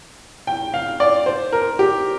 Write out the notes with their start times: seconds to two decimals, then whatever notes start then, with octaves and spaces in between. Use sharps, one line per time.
0.47 G5
0.74 F5
1.00 D5
1.26 C5
1.53 A#4
1.79 G4